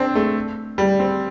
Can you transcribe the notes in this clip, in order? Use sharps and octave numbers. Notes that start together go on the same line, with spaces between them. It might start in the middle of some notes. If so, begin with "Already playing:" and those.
Already playing: C4 D4
A3
G3
C4